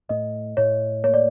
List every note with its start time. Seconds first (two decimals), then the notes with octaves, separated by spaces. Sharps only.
0.09 A2 D#5
0.57 A2 C#5
1.04 A#3 C#5
1.14 D5